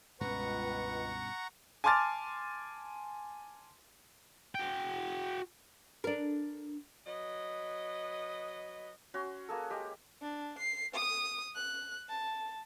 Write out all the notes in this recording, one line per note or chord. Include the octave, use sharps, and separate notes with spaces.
C#2 G2 B2 C#4 B4 F#5 A#5 C#6
G#5 A5 C6 D6 F6 A6
F#4 G5
D4 A#4
F#3 B4 D#5
C#4 F#4 C6
A#3 G#4 A4
G#3 G4
D4
C7
D#6
F#6
A5